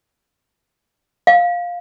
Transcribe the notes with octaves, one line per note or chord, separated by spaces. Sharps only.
F5